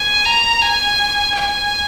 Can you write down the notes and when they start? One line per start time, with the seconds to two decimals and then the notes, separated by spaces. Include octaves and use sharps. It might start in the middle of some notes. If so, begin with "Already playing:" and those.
Already playing: G#5
0.25 A#5
0.62 G#5
1.34 G#5